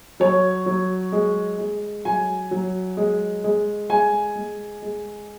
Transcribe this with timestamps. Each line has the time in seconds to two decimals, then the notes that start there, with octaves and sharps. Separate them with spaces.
0.20 F#3 C#5
0.66 F#3
1.12 G#3
1.58 G#3
2.05 F#3 G#5
2.51 F#3
2.97 G#3
3.44 G#3
3.90 G#3 G#5
4.36 G#3
4.82 G#3